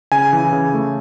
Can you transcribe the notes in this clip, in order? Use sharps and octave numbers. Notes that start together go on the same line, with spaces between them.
C#3 G#5
E3
C#3
A3